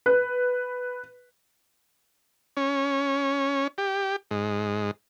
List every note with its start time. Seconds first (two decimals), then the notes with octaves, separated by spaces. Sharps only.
0.06 B4
2.57 C#4
3.78 G4
4.31 G#2